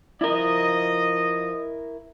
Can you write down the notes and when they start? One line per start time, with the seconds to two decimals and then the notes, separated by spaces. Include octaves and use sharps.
0.21 F3 E4 A#4 D#5